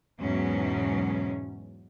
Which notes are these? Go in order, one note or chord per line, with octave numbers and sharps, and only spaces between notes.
E2 G#2 B2 F#3 C#4